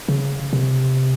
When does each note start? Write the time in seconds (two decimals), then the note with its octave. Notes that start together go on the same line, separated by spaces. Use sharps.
0.08 C#3
0.53 C3